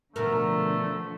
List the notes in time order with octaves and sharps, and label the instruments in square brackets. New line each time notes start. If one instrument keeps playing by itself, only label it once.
[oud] D2 B2 A#4 [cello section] D3 F3 [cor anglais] A3